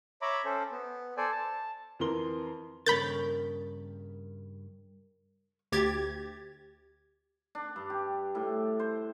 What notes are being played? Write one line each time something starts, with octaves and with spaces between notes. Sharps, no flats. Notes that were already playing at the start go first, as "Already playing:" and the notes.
C#5 E5 A#5 B5 D6
C#4 A4 C5
B3
A4 C5 D5 G#5
A5
F2 E3 A#4 C6 G7
G2 A#2 C#3 A#4 C#5 B5 G6 A6
D2 G4 G#6 A6
D4
G2
G4
A2
C5